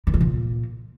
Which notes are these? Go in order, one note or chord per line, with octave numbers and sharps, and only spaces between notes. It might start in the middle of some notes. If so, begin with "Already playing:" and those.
D#3
E3
A#2